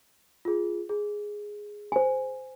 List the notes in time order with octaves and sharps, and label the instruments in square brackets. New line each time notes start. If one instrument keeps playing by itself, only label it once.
[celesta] F4 G#4
G#4
[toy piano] C5 G#5